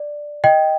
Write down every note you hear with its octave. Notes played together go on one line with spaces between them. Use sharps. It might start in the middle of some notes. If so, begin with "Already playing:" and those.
Already playing: D5
D#5 G5